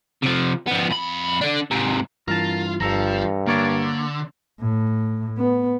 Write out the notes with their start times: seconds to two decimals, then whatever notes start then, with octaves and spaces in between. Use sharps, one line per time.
0.22 C3 F3
0.67 F3 B3
0.90 F2 B5
1.41 D3 D4
1.71 G#2 C3
2.28 G2 E3 F4 A#4 A5
2.80 G1 G2 F3 A4 A#5
3.47 D3 A#3 A#4 C#5 D5
4.60 A2
5.38 B3